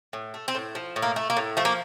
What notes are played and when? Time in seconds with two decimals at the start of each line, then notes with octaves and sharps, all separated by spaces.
0.13 A2
0.34 A3
0.48 C4
0.55 A2
0.75 F3
0.96 A2
1.02 A#3
1.16 A3
1.30 A#3
1.37 A2
1.57 F3 A3
1.65 A#3